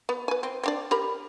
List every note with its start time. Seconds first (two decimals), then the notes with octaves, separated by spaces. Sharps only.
0.09 B3
0.28 B4 G#5
0.43 C4
0.63 C4 D4 D5
0.91 G4 A#4 B5